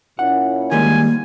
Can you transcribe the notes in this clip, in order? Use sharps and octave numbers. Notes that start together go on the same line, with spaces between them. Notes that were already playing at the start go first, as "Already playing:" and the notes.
A#2 C#4 E4 F#5
D#3 G3 G#3 A#3 G#5